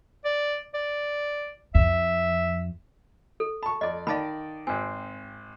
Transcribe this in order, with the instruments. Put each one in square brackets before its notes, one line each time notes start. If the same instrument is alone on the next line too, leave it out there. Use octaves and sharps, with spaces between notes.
[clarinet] D5
D5
[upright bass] F2 [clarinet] E5
[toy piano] A4
[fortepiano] A5 C#6 [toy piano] B5
[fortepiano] F2 D5 [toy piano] D#5
[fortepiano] D#3 D5 [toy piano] F5 A5 B5
[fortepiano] G#1 C4 [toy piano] G#5